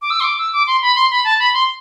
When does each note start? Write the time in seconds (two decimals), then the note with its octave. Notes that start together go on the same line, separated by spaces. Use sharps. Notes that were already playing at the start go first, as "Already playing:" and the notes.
0.02 D6
0.10 E6
0.20 C6
0.24 D6
0.38 E6
0.53 D6
0.67 C6
0.82 B5
0.96 C6
1.11 B5
1.24 A5
1.39 B5
1.54 C6